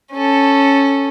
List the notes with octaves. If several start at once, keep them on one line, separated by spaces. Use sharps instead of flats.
C#4 A4